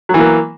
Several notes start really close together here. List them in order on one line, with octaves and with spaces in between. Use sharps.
F#3 E3 A#3